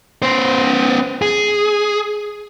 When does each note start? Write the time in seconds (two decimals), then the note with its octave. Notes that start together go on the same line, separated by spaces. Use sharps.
0.22 B3 C5
1.22 G#4